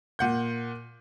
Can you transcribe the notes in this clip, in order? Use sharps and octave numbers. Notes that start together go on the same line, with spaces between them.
A#2 F#5 G6